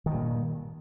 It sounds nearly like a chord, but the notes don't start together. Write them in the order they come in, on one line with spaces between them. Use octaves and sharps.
D#3 G2 A#2